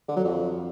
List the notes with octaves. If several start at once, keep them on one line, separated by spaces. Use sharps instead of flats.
D3
F#3
F2